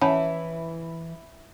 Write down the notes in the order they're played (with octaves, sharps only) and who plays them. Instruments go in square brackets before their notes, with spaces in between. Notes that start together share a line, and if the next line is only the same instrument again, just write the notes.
[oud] E3 [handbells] C#4 F#5 [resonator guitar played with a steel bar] E4 [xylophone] C#5 A5 B5